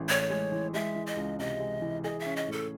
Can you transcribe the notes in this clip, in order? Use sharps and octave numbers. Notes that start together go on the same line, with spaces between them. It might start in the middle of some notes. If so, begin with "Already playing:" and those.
Already playing: A1 E3 G#3
A2 C#5
G#3
E3
G#3 E5
E3
D#5
C#2
C3 D#5
G#3
E3
G#4 D#5
E5
C#4
D#5
A2 A4